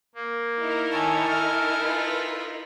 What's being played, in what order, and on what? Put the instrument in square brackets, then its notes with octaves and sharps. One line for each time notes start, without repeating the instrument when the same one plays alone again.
[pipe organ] A#3
[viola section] D#4 E4 A#4
[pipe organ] D#3 A4 C#5 [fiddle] G#5
[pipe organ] A4 F6
[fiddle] F4 B4